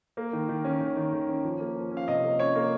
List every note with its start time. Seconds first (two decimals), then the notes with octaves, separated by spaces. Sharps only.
0.17 A#3
0.33 D#3
0.49 D#3
0.65 C#4
0.81 D#3
0.97 D#3
1.12 D#3
1.29 C#4
1.44 F3
1.60 A#3
1.76 F3
1.92 C#4
1.97 F5
2.08 C3 D#5
2.24 A#3
2.39 C#4 C#5
2.55 A#3